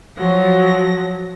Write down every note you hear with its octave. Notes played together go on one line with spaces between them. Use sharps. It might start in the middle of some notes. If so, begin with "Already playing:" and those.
F3 F#3 A#6